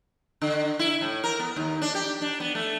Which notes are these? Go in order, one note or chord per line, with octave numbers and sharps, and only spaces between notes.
D3
E4
A2
A#4
B3
D#2
D4
G4
D4
B3
A3